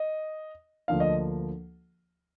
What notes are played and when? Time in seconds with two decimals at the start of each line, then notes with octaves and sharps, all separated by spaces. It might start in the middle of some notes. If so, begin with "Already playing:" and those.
Already playing: D#5
0.88 D2 D3 F3 A#3 D4 F5
1.00 D#5